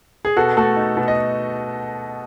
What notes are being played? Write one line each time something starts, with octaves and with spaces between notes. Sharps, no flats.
G#4
B2 F#4 A4
A3 F#4 A4
D#4
B2
D#5